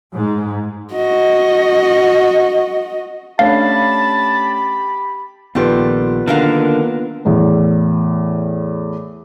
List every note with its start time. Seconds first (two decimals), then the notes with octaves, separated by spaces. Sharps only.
0.15 G#2
0.93 F#4 D#5
3.39 A3 C#4 D4 G4 F5 A5 B5
5.55 A#1 D#3 G3 A3 B3 F4 B4
6.28 D3 D#3 F#3 A#3 A#4 F5
7.25 E2 A2